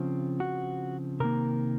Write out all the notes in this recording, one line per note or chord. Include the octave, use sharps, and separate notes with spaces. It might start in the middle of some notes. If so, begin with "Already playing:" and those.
Already playing: C#3 F3 C4
F#4
C3 D#3 A#3 A#4